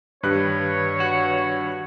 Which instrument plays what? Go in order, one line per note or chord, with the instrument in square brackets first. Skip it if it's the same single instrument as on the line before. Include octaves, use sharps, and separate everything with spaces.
[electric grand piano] G2 B4 F#6 [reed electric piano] D#3 G4 [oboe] C#5
[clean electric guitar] F#4